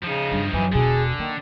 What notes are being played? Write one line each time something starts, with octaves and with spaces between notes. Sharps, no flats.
C#3 F3 D#4
G2
F#2 E3
E1 B2 D3 G#4
D#3 A#3